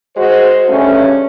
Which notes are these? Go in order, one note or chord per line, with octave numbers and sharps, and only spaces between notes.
G#3 F#4 C5
G2 C#3 A3 C#4